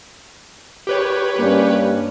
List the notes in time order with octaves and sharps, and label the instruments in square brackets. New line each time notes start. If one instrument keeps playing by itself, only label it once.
[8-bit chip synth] G4 B4 C#5
[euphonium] G2 [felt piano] A#3 C#4